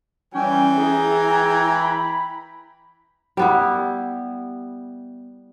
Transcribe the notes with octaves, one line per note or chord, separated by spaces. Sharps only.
E3 G3 C#4 G5 G#5
E4 G#4 A#5
B5
G3 B3 E4